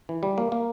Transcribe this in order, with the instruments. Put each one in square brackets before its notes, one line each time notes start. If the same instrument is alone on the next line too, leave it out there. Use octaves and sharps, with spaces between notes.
[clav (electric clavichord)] E3
G3
A#3
A#3